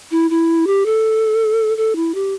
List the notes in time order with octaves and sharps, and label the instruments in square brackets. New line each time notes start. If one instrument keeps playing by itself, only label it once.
[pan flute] E4
E4
G4
A4
A4
E4
G4